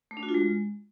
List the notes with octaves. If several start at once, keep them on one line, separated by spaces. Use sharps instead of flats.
A3
D4
F#4
F4
G#3